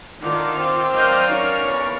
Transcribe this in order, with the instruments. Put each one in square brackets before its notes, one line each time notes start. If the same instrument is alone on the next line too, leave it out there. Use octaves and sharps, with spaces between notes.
[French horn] D3 [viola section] D#3 [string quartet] F4 [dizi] D6
[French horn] C4
[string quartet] F#3 D#5 G6 [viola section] A#4 D5 F5
[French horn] C#4 [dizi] D#4 [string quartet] F#4 C#5
[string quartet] E2 [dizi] C#6